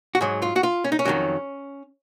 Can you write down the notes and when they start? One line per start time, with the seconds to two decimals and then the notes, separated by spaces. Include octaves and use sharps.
0.15 F#4
0.21 G#2 F#3 G#4
0.42 F4
0.56 F#4
0.63 F4
0.84 C#4
0.92 D#4
0.99 C#4
1.05 F2 D#3 F#3